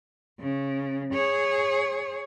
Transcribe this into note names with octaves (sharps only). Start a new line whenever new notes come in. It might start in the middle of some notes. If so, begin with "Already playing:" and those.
C#3
G#4 C#5